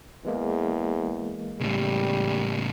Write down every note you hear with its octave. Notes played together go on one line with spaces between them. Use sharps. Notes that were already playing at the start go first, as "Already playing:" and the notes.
E2 E3 G#3 A#3
A2 C#3 G3